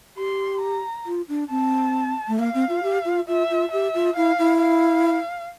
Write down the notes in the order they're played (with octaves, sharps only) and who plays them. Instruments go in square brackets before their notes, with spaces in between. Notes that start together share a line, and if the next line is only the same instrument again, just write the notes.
[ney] G4 [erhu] C6
[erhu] A#5
[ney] F4
D4
[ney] C4 [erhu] A5
[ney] A3
[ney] A#3 [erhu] F5
[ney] C4
F4
G4
F4
[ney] F4 [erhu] E5
[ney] F4
[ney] G4 [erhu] E5
[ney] F4
[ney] E4 [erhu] F5
[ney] E4
[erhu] F5